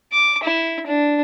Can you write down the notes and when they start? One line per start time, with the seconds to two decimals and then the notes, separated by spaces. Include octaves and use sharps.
0.13 D6
0.44 E4
0.87 D4